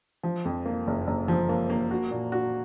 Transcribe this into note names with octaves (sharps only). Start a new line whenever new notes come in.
F3
F2
A#3
F#1
F#1
F3
A#3
A#3
F#4
A#2
F#4